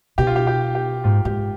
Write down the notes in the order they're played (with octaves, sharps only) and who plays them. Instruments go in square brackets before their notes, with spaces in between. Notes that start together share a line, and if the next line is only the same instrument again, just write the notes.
[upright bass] B2 [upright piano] G4
[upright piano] F4
G4
G4
G4
[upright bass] G#2 [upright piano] F4
[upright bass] G#2 [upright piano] G4